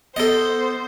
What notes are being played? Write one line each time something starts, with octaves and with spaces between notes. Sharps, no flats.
B3 A4 C5 D#5